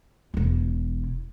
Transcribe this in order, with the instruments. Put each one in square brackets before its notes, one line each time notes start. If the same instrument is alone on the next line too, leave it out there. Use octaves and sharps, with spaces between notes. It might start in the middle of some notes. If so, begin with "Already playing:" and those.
[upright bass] E1 E4